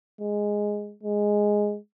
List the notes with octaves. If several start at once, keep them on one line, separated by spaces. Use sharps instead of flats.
G#3
G#3